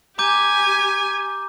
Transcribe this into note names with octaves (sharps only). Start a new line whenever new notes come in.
G4 G#5 A#5 D6 G6